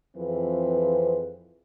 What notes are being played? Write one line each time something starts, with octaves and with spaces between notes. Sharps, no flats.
F2 E3 F3 C4 G#4 B4